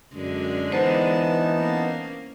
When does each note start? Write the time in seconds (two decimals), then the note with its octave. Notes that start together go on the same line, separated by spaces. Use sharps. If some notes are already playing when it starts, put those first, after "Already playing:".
0.15 F#2 D3 G#3 D4
0.72 E3 B3 D#4 C5 A5
1.59 A#3 C#4